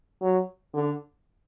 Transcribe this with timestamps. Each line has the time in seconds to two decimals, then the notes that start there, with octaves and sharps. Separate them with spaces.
0.22 F#3
0.74 D3